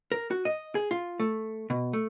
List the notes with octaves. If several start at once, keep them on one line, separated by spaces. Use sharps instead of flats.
A#4
F#4
D#5
G#4
F4
A3
B2
A3